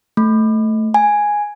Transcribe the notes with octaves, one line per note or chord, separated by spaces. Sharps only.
A3
G#5